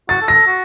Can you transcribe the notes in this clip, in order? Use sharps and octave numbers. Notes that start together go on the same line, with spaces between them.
F#4 A6
A4
A#6
A4
F#4